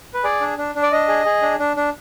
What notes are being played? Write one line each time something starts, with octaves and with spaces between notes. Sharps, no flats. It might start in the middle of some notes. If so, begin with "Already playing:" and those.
B4
G#4 D5
D4
D4
D4
D5
D4 D#5
G#4
G#4
D4
D4
D4